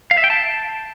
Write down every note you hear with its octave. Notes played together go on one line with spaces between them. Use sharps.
F5
E5
G5
A5